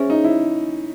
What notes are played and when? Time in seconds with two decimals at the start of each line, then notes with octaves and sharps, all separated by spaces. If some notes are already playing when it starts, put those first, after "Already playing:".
Already playing: C#4 G#4 C5 E5
0.10 D#4
0.25 E4